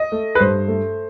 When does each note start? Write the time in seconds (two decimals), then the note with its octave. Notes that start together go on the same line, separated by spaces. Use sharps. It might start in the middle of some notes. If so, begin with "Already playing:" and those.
Already playing: D#5
0.12 A3
0.35 B4
0.40 G2 C5
0.68 A3